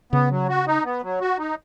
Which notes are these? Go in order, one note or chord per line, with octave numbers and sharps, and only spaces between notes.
C#3 B3
F#3
F#4
D#4
B3
F#3
F#4
D#4